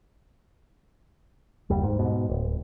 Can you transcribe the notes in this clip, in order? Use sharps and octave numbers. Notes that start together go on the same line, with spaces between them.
F#1 D#2 G3
G#2
G#2 B2
D1